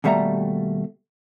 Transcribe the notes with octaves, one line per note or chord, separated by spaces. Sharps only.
D#2 B2 G3 A3 E5 A#5